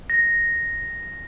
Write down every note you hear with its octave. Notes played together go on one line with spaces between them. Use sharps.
A#6